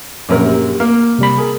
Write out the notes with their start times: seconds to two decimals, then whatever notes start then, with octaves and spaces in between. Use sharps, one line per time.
0.29 A#1 F#2 A#4
0.45 G4
0.80 A#3 F6
1.19 C3 G3 B5
1.38 G#4 A#4